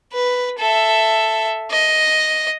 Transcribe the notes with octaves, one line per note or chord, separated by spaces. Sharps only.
B4
A4 E5
D#5